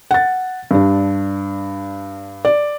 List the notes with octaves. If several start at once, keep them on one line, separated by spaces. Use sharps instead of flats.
F#5 A6
G2 D4
D5